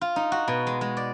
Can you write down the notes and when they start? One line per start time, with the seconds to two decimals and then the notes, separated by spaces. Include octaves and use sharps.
0.01 F4
0.16 D#4
0.32 F#4
0.48 B2
0.67 G#3
0.81 G#3
0.97 D5